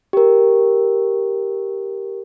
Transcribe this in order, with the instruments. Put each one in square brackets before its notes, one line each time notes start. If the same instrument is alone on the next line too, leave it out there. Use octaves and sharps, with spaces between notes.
[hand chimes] G4 A#4